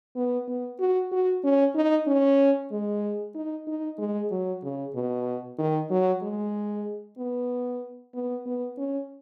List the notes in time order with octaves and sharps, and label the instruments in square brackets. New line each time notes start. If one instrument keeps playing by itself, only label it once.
[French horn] B3
B3
F#4
F#4
C#4
D#4
C#4
G#3
D#4
D#4
G#3
F#3
C#3
B2
D#3
F#3
G#3
B3
B3
B3
C#4